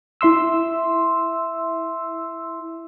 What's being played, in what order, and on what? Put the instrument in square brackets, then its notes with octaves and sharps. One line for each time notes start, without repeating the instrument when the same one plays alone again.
[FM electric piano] E4 E5 C6 E6